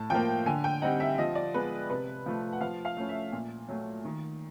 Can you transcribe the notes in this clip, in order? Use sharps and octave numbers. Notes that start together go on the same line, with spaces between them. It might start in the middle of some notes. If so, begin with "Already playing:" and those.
Already playing: A2 A5
F3 A#3 G5
D3 G#5
G5
G3 C4 D#4 F#5
E5
F3 D#5
D5
G#3 B3 B4
C3 B4
F3 A3
F#5
F3 F5
F5
A3 C#4 E4
E5
A#2
F#3 A3
D#3